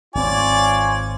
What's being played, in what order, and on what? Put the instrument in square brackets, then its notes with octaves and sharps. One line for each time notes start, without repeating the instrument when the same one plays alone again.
[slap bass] G#1 C4 [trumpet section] F4 C#5 G#5 [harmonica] D5